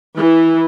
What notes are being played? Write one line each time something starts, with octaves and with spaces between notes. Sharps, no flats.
E3